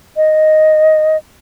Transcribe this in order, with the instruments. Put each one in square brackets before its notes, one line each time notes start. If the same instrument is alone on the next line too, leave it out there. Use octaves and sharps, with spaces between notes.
[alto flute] D#5